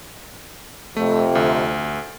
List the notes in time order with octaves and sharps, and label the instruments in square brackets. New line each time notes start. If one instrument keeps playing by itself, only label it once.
[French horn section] F2 C3 [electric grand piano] A3
[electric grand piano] D2